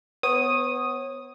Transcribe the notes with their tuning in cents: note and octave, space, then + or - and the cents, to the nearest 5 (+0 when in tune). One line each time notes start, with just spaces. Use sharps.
B3 +15 C#5 -30 D#6 +0